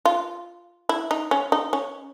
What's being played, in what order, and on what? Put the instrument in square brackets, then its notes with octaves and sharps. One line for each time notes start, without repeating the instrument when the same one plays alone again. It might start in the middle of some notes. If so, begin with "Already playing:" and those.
[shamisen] F4
E4
D#4
C#4
D#4
C#4